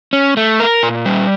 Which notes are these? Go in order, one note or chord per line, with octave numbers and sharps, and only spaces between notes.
C#4
A3
A#4
A#2
G3